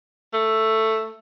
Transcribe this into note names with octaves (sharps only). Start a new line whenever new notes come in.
A3